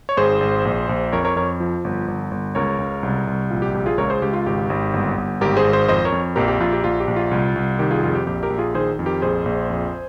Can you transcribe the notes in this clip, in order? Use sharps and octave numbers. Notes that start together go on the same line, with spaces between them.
C#5
G#1 G#4 C5
G#1
A#1
A#1
F2 A#4 C#5
A#4 C#5
F2 A#4 C#5
F3
G1
G1
G1
C#2 A#4 C#5
C#2
C2
C2
A#1 F4
G4
A#1 G4
F4 G#4
C#2 A#4 C#5
G#4 C5
C#2 G4
F4
G#1 G4
G#1
G1
G1
G#1 G4 A#4
G#4 C5
G#1
G#4 C5
F2 C5 D#5
A#4 C#5
F2
A#1 G4 A#4
G4
A#1 F4
G4
A#1 F4
G4
A#1
F4
C2
C2
D#3 G4
F4 G#4
F2 F4 G#4
G4
A#1 G4
G4 A#4
A#1
F4 G#4
D#3 G#4 C5
F2
G4 A#4
A#1 G#4 C5
A#1
F2